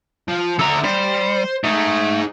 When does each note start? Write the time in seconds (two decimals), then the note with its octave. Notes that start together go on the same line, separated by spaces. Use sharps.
0.28 F3
0.59 D3 A4 E5 A#5
0.84 G3 C5
1.64 A3 D#4 G#4